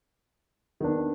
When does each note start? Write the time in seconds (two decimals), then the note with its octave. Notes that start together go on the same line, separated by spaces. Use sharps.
0.80 D#3 B3 D4